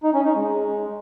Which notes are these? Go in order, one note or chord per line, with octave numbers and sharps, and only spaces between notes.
D#4
C#4
D#4
G#3